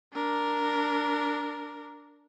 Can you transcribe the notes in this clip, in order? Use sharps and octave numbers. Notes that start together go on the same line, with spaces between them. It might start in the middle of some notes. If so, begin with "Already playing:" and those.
D4 A#4